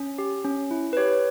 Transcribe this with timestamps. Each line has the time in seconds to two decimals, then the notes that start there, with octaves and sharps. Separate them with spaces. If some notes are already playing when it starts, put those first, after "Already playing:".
Already playing: C#4
0.18 G4
0.44 C#4
0.71 E4
0.93 B4
0.97 G4 C#5